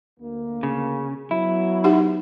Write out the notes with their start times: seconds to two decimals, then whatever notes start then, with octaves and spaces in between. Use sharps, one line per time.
0.20 D2 A#3
0.63 C#3
1.31 F#3 B3 E4
1.84 D#4 G4 F#5